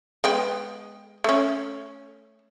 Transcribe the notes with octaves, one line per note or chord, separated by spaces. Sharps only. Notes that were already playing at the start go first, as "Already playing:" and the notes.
G#3 B3 G5
A3 C#4